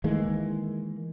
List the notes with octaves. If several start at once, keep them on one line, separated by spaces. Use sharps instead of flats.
D#3 E3 G#3 A#3